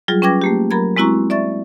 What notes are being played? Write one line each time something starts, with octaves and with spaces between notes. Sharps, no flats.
F#3 G3 F4 G#4
C#4 B4 G5 D6 G#6 A#6
A3 A#3 G4
F#3 A#4 A#5 B5 G#6
G#3 C4 E4 F#4 A#5 C#6
D5 E5 C#6 A6